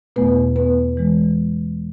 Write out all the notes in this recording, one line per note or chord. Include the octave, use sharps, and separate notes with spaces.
E2 B2 A3 B3 B4
B3 B4
E3 G#3